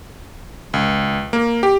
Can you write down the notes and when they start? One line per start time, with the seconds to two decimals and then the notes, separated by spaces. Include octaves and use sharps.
0.74 C#2
1.33 A#3
1.63 G4